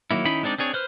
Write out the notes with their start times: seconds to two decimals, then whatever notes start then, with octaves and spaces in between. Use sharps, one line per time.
0.11 D#3 F#3 A#3 E4
0.25 D#3 C#4 D#4 E4 B5
0.43 G#3 C4 D4 D#4 D5
0.58 C4 D4 G#4 C#5
0.73 B4 C5 F6